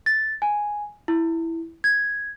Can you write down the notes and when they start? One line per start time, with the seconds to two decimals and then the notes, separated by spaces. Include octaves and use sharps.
0.06 A6
0.42 G#5
1.08 E4
1.84 G#6